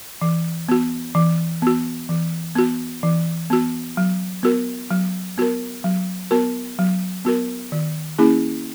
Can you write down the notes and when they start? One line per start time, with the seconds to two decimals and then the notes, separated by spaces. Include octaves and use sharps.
0.22 E3
0.69 B3 F#4
1.15 E3
1.62 B3 F#4
2.09 E3
2.55 B3 F#4
3.03 E3
3.50 B3 F#4
3.97 F#3
4.43 B3 F#4 A#4
4.91 F#3
5.38 B3 F#4 A#4
5.84 F#3
6.31 B3 F#4 A#4
6.79 F#3
7.25 B3 F#4 A#4
7.72 D#3
8.19 A#3 C#4 E4 G#4